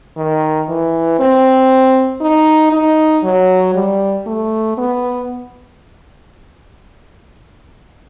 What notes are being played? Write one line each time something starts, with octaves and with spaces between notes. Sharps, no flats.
D#3
E3
C4
D#4
D#4
F#3
G3
A3
B3